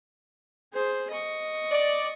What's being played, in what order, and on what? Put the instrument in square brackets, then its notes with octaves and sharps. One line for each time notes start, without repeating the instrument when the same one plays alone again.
[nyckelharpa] G#4 C5
D#5 C#6
[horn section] D5